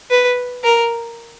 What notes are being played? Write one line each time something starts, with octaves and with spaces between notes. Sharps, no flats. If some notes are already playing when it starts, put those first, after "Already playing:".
B4
A#4